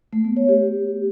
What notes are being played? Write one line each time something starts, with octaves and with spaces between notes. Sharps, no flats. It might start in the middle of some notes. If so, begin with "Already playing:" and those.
A3
B3
C#5
G4